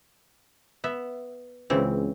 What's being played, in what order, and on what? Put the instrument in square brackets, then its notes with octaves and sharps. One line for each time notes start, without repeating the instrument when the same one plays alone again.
[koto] B3 E5
[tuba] C#2 [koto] C#3 E3 C4